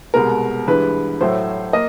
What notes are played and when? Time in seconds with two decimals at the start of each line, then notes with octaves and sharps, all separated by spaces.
0.14 C2 B2 G#3 A#4
0.67 G2 E3 G#3 B4
1.21 A2 F#3 A3 C5
1.73 A#3 D#5